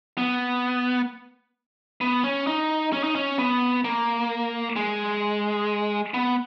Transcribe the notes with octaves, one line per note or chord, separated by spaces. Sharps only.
B3
B3
C#4
D#4
C#4
D#4
C#4
B3
A#3
G#3
B3